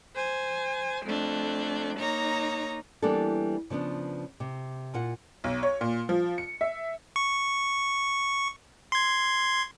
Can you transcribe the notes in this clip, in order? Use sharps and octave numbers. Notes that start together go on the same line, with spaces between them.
C5 G#5
F2 A3 D4
A#3 D#4 C#5 A#5
E3 G3 A#3 B3 D4 A4
C#3 F3 B3 D4
C3
A#2 F4 F#5
B1
C#5
A#2
F3
C#7
E5
C#6
C6 G#6